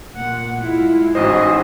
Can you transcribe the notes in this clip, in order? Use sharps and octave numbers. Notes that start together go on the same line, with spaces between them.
A#2 F#5
G#3 E4 F4
A1 G#2 F#4 G#4 C5 D#5 E5